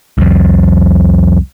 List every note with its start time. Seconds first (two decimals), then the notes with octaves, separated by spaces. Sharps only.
0.18 C2 F2